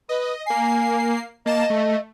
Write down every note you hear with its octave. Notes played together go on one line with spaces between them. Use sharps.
B4 D#5
A#3 G#5 C7
A#3 D#5 A5 E7
A3